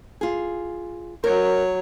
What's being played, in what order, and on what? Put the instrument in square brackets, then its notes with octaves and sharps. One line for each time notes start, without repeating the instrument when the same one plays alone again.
[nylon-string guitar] F4 G#4
[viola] F#3 C#5 [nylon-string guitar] A#4